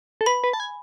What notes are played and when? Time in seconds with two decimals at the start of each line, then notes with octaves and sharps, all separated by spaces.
0.21 A4
0.26 B4 B5
0.44 B4
0.53 A5
0.60 G#5